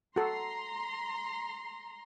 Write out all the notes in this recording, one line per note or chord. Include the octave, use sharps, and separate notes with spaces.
F#4 A4 A#5 C6